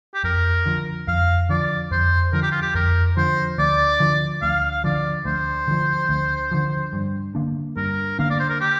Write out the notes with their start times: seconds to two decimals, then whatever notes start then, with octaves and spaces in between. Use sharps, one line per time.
0.14 G4
0.24 F2 A#4
0.66 D3 F3
1.08 F2 F5
1.49 D3 F3 D5
1.91 F2 C5
2.33 D3 F3 A#4
2.43 G4
2.51 F4
2.62 G4
2.75 F2 A#4
3.17 D3 F3 C5
3.58 D2 D5
4.00 D3 F3
4.42 D2 F5
4.72 F5
4.84 D3 F3 D5
5.25 D2 C5
5.68 D3 F3
6.09 D2
6.51 D3 F3
6.93 G2
7.35 D3 A#3 D4
7.77 G2 A#4
8.19 D3 A#3 D4 F5
8.30 D5
8.39 C5
8.50 A#4
8.61 G4